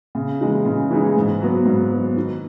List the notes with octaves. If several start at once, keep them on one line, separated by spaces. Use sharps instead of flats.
C#3
E3 G#3 D#4
C#3
E3 G#3 D#4
G#2
F#3 B3
G#2
F#3 B3
D#3